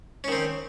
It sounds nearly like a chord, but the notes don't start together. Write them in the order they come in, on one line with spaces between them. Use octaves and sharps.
C#4 D#3 C4